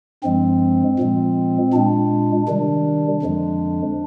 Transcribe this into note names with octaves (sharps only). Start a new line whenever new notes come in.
G2 F3 G#3 C4
A#2 F3 G#3
A#2 G#3 D4
C3 D#3 G3 D4
F2 D3 F3 G#3